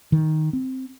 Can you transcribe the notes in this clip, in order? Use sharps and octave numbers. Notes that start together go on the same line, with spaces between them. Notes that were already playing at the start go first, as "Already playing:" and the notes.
D#3
C4